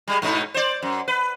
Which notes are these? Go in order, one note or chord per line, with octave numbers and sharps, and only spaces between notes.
G3 G#3
G#2 B2 D#4
C5 D5
F#2
B4